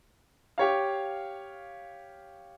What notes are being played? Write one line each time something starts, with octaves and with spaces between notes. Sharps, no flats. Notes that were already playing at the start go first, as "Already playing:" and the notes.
G4 C#5 F5